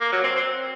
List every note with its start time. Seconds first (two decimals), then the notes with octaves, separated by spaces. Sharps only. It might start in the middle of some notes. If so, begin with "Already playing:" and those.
0.01 A#3
0.12 F#3
0.24 C4
0.35 C4